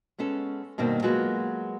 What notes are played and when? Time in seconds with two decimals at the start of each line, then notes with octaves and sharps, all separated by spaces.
0.18 G#3 B3 C#4 A4
0.78 G2 B2 D#3 A#3 C4
1.02 F#3 G#3 A#3 B3 F4 F#4